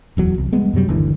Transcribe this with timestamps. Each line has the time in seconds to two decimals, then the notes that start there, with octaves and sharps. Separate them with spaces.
0.17 D1 E2 F#3
0.38 C2
0.52 G3 G#3 B3
0.73 F#2 C3 F#3 G3
0.88 G1 D#2 D3 E3